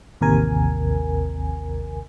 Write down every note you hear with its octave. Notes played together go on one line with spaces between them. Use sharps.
A1 D#2 C3 A#4 G#5